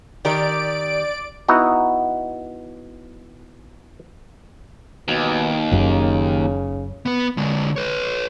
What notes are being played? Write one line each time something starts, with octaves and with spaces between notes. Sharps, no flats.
D#3 G4 A#4 D5 D7
B3 D#4 E4 F#4
D#2 B2
F#1 F#2 C#3
B3 B4
D3 G#3
B4 C#5